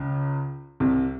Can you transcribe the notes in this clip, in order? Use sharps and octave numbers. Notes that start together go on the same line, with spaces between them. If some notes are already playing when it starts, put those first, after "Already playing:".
Already playing: C#2 C#3
C2 C3